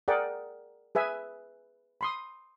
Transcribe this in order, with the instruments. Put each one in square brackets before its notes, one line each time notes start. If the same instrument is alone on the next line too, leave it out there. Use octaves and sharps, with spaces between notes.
[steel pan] G#4 A#4 D5 F#5 G5
G#4 B4 E5 G#5
B5 C6 D#6